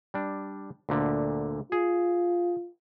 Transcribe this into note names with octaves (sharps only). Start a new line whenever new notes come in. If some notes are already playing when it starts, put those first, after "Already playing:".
G3 D4
D2 A#2 D3
F4 G#4